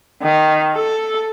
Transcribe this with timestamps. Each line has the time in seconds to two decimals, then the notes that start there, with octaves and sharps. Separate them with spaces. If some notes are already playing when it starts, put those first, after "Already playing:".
0.23 D#3
0.75 A4